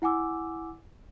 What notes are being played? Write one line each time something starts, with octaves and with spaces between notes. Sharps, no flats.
E4 F#5 G#5 D6 E6